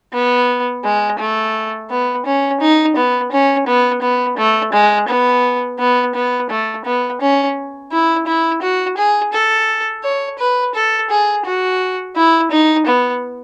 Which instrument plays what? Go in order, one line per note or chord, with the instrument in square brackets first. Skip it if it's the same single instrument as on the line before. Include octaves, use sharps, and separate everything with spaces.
[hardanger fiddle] B3
G#3
A3
B3
C#4
D#4
B3
C#4
B3
B3
A3
G#3
B3
B3
B3
A3
B3
C#4
E4
E4
F#4
G#4
A4
C#5
B4
A4
G#4
F#4
E4
D#4
B3